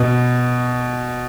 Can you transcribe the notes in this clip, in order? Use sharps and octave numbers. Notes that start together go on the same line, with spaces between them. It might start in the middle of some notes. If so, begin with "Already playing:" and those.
Already playing: B2